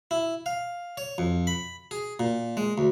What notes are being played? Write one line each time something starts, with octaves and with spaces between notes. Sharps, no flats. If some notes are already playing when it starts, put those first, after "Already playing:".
E4
F5
C#5
F2
B5
G#4
A#2
G#3
D2